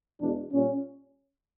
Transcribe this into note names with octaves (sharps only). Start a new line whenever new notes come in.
E2 B2 G#3 D4
A#2 G3 C#4